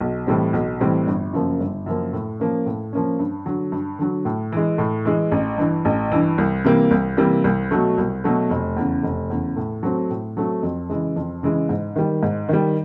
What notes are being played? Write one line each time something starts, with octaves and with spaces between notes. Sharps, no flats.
B1
A2 E3 G3 C4
B1
A2 E3 G3 C4
G1
F#2 C#3 F3 A#3
G1
F#2 C#3 F3 A#3
A2
F3 A#3 C#4
A2
F3 A#3 C#4
G2
D3 F#3
G2
D3 F#3
A2
E3 G#3
A2
E3 G#3
A1
G2 E3
A1
G2 E3
C2
C3 E3 G3 A#3
C2
C3 E3 G3 A#3
C2
B2 F#3 A3
C2
B2 F#3 A3
F1
E2 C#3
F1
E2 C#3
A2
F#3 A3 C4
A2
F#3 A3 C4
F2
C#3 E3 G#3
F2
C#3 E3 G#3
G#2
D#3 G3
G#2
D#3 G3